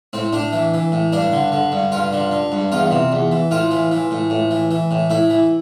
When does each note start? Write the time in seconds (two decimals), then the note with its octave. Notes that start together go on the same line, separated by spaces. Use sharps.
0.13 A2 C4
0.33 A2 D4
0.53 E3
0.74 E3
0.92 A2
1.13 G2 D4
1.32 D3
1.52 D3
1.72 G2
1.92 G2 F4
2.13 D3
2.31 D3
2.52 G2
2.72 E2 F4
2.91 C3
3.12 E2
3.31 E3
3.51 A2 F4
3.71 E3
3.91 E3
4.11 A2
4.30 A2
4.51 E3
4.71 E3
4.91 A2
5.10 A2 E4
5.30 E3